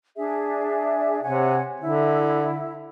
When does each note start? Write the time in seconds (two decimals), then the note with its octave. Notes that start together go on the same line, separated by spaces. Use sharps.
0.16 D4 G#4 E5
1.23 C3 C#5 F#5 G#5
1.82 D3 E4